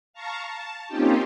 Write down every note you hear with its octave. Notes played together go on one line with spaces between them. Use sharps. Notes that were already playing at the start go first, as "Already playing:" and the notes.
F5 A5 A#5 C#6
A5
A#3 C4 C#4 D#4 F4 G4